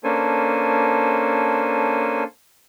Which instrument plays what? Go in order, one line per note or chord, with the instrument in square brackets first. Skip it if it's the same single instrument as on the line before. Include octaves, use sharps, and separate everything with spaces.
[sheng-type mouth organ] A#3 C#4 D4 A4 C5 G#5